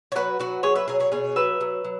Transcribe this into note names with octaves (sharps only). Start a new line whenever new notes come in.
C#5
F#3 F#4 B4
F#3 F#4 B4
F#3 G#4 C#5
B4 E5
F#3 G#4 C#5
G#4 C#5
B2 G#4 C#5
F#3 B4 E5
F#3
F#3